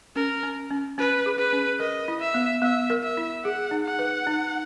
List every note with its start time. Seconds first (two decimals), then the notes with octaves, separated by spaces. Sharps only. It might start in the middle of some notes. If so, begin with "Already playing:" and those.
0.16 C#4 A#4
0.43 C#4
0.71 C#4
0.98 C#4 B4
1.26 G#4
1.39 B4
1.53 C#4
1.80 A#4 D#5
2.08 E4
2.21 E5
2.34 B3
2.62 B3 E5
2.90 A#4
3.04 E5
3.17 E4
3.45 G#4 F#5
3.71 D#4
3.86 F#5
3.99 B4
4.27 D#4